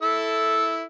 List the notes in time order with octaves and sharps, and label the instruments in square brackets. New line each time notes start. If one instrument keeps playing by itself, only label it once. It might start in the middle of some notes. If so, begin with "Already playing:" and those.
[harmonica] E4 A4 E6